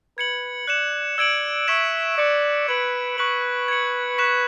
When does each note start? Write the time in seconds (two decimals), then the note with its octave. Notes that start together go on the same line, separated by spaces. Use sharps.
0.18 B4 G#6 C#7 F#7
0.68 D5 F#6 C#7 E7
1.18 D5 E6 G#6 D7 F#7
1.68 E5 C#6 E6 G#6 B6 E7
2.18 D5 C#6 F#6 C#7
2.68 B4 G#6 D7 F#7
3.18 B4 C#6 F#6 B6 F#7
3.68 G#6 C#7 F#7
4.18 C#6 F#6 B6 E7